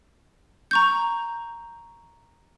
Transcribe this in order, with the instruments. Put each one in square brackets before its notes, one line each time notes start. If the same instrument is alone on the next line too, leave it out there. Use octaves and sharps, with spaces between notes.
[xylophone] A#5 C#6 G6